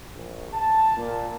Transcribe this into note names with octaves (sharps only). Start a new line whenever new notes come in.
A#1
A5
A#2